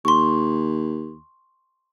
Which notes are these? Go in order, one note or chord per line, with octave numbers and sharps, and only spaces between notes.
D#2 C6 C#6